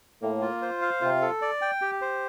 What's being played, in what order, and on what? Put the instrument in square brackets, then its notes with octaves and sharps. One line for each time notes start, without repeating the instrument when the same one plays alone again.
[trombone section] A2 [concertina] A#3
[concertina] F4
C5
F5
[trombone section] C3 [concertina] F4
[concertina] A4
D5
G5
G4
C5